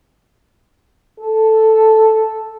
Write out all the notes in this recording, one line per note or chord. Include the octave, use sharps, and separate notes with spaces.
A4